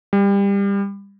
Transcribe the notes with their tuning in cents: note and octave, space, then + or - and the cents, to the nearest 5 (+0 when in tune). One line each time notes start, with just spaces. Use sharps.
G3 +25